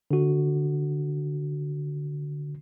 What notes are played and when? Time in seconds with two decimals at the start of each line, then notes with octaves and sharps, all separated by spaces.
0.11 D3 F#4